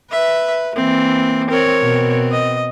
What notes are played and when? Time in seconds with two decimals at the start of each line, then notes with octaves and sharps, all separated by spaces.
0.11 B4 E5
0.76 E3 A#3 C4
1.50 C4 A#4 C#5
1.82 B2 C4
2.31 D#5